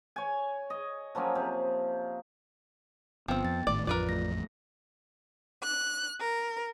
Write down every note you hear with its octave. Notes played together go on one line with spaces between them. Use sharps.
C#5 G#5
D#5
F3 F#3 A#3 C#4
C3
G1 F3 B3 C4 G5
F2 A6
G#1 A2 D#3 D5
A1 F2 F4 A#4 B4 D5
A3 A#6
F#6
A#4